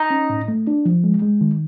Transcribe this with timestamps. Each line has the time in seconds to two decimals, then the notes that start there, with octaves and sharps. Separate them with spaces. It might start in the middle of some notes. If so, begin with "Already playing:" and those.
Already playing: D#4
0.10 C#4
0.30 A2
0.48 A3
0.67 D4
0.86 F3
1.04 G#3
1.22 G#3
1.41 D#3